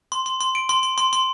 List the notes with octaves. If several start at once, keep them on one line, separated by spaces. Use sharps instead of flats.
C6
C6
C6
D7
C6
C6
C6
C6